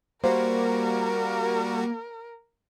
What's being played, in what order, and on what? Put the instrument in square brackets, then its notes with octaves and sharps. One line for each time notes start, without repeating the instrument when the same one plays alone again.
[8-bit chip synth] G3 F#4 [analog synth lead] A#3 [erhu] A#4 [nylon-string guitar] C5